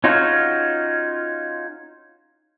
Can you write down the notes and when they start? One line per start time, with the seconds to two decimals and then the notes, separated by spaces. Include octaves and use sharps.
0.04 C#4 D#4 F4 F#4 G#4